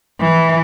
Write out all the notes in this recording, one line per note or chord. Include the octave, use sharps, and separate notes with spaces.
E3